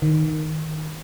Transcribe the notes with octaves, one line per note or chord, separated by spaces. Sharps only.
D#3